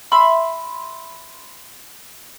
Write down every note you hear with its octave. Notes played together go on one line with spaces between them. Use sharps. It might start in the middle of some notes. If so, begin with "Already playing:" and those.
E5 B5 C6